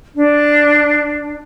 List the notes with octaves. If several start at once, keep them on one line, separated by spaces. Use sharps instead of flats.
D4